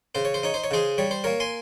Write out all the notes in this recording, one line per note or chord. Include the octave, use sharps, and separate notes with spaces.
C#3 C5
C#5
C5
D#4 C#5
C5
C#5
C#3 G#4 C5
G3 C#5
C5
A#3 A#4 C#5
G#5 C6